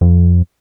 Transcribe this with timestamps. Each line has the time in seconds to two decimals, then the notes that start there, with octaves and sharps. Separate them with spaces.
0.01 F2